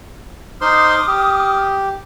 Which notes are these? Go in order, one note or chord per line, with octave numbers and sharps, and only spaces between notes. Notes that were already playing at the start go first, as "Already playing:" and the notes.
D#4 C5 C6 D6 D#6 F6
G4